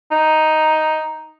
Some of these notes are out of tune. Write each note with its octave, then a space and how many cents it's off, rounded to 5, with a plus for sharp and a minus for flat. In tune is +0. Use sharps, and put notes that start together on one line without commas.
D#4 +5